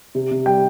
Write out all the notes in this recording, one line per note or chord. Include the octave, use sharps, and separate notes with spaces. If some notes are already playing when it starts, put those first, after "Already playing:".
C3
C3
G3 G5